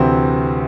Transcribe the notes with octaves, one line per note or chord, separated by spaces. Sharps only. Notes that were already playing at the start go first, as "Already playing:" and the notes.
Already playing: D2 C3 E3 C4